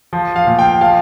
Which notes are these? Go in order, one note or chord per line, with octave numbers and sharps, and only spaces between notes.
F3
F5
A#2
G5
F3 F5